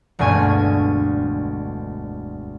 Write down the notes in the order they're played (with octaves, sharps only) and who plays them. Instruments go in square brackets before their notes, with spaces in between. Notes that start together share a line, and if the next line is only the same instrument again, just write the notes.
[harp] E1 D2 G2 G#5 C#6 G#6